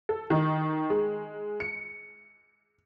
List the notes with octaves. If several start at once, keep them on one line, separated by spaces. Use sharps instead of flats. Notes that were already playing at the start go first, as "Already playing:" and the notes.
A4
D#3 D#4
G#3
C#7